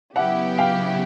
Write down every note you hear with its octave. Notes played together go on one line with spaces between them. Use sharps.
C#3 F#3 B3 E4 G4 E5 F#5
F5 G5